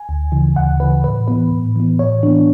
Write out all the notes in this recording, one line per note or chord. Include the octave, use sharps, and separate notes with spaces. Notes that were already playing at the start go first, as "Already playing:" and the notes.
Already playing: G#5
D2
C#3 E3
D2 F#5
C#3 E3 B4
A2 B4
E3 B3 B4
A2
E3 B3
A2 C#5
E3 B3 D4